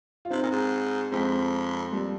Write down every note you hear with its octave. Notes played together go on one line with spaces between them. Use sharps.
F4
C3 C4 D#4
A#2
G#2
F2 G#3 C4
F2 G3 A#3